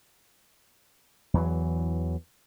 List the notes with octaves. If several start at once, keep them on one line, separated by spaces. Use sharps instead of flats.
E2 E3 F#3